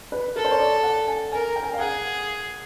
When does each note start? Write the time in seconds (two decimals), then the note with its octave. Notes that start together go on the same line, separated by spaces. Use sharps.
0.12 B4
0.36 A4 A#4
0.44 C5
0.51 C#5
0.59 D5
0.83 F#5
1.08 G#5
1.32 A#4 G#5
1.56 G5
1.63 G#5
1.73 F5
1.79 G#4 F#5